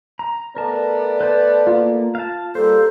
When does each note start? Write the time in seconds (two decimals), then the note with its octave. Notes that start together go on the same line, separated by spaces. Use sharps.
0.19 A#5
0.57 A3 B3 A#4 D5 A5
1.21 B4 C5 A5
1.67 A#3 F4
2.15 F5 A5
2.55 G3 A#3 A4 C5